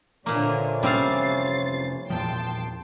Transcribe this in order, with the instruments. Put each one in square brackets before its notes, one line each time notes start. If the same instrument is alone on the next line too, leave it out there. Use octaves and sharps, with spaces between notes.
[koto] A#2 A#3 [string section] D3 [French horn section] E3 C5 C#5
[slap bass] F1 A#3 C#4 [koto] G3 C4 F5 [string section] A6 C7
[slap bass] E2 A#2 F3 [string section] G5 A5 C6